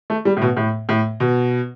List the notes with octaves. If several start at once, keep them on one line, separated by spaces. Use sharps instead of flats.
A3
G3
A2
B2
A2
A2
B2